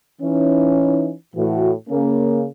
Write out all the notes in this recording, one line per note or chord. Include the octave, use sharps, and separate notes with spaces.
E3 C#4 D#4
A2 E3 F#4
C#3 A#3 C#4